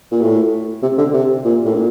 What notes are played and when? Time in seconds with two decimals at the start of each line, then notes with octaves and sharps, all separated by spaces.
0.11 A#2
0.21 A2
0.82 C3
0.98 D3
1.14 C3
1.44 A#2
1.65 A2
1.75 A#2